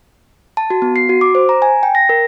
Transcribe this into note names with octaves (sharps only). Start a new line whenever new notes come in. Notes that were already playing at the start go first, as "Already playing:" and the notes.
A5
F#4
B3
C7
F#4
D6
C5
A#5
G#5
G5
A#6
A#4